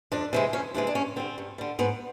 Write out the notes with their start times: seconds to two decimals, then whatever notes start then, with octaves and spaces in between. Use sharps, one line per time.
0.12 F2 D4
0.33 C3 E3 G#3
0.53 F2 C#4
0.74 C3 E3 G#3 D4
0.87 D4
0.95 G2 C#4
1.16 D3 G3 C4
1.38 G2
1.58 D3 G3
1.79 G#2 B3